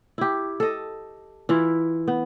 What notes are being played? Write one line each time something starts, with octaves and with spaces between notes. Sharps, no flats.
E4 G4
A4 D#5
E3 E4 F4
B3